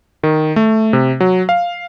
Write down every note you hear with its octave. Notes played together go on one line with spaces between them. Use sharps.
D#3
A3
C3
F#3
F5